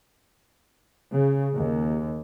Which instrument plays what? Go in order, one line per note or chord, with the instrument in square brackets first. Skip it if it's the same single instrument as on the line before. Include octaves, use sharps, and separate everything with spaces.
[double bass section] C#3
D#2